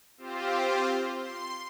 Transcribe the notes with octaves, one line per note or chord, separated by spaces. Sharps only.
C4 F4 G4 C5
C6